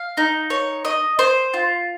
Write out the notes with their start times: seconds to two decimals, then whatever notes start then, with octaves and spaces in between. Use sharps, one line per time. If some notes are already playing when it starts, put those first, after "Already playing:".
Already playing: F5
0.17 D#4
0.50 C#5
0.85 D#5
1.19 C5
1.54 F4